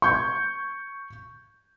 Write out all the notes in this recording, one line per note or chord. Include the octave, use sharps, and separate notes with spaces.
C#6 G6 G#6